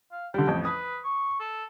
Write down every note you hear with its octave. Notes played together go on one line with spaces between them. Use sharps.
F5
D3 G3 G5
A1 F2
B4 D#6
C#6
A4